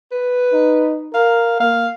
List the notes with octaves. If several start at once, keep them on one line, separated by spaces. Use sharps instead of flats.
B4
D#4
A#4 F5
A#3 F5